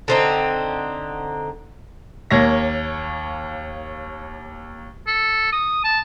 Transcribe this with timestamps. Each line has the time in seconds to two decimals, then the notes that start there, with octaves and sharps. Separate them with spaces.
0.08 D3 C4 D#4
2.31 D#2 A#3 C#5 A#6
5.07 A4
5.52 D#6
5.84 A5